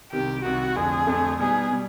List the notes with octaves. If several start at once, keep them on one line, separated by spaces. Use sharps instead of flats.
C2 C3 D#3 G4
C2 C3 D#3 F#4
F2 D3 F3 A3 G#4
F2 D3 F3 A3
B2 G3 B3 D#4 G#4
B2 G3